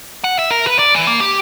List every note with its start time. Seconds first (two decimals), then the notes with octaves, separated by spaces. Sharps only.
0.24 F#5
0.39 E5
0.51 A#4
0.67 B4
0.79 D5
0.94 E3
1.07 A#3
1.20 G4